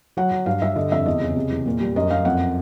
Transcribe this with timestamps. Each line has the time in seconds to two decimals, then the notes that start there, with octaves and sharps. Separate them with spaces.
0.17 F#3 F#5
0.31 F#3
0.46 G2 F5
0.62 G2 E5
0.76 D3 D#5
0.91 F2 E5
1.06 E2 D#5
1.21 C#3
1.36 C3
1.51 E2
1.66 A#2
1.81 G3
1.96 F#2 D#5
2.10 F#2 F5
2.25 F2 F#5